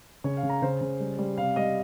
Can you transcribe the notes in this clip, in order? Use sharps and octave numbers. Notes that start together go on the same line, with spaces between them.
C#3 C#5
F5
C#3
A#5
C#3 C5
C#3
G3
G3
C3 F5
G3 D#5